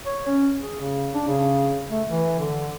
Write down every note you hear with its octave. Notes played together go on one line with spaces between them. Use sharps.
C#5
C#4
G#4
C#3
D4
C#3
A3
E3
D3